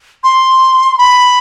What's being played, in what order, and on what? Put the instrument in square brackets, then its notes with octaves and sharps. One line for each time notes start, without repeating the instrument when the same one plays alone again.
[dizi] C6
B5